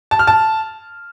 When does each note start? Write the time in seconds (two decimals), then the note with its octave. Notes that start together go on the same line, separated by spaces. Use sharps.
0.11 A5
0.19 F6
0.27 A5